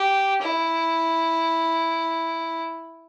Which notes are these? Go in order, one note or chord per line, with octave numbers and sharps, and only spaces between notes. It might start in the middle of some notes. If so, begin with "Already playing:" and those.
Already playing: G4
E4